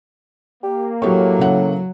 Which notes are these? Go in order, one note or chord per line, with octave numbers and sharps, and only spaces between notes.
A#3 G4
A2 F#3 G4 C#6
C#3 E5 F#5